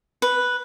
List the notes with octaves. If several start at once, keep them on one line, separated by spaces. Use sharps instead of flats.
B4